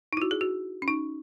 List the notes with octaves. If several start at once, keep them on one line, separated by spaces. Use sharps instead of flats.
D#4 E4
F#4
G#4
F#4
C#4
D#4